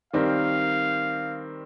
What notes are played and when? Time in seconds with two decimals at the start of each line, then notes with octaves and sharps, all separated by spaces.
0.13 D#3 G3 C4 G4 A#4 F5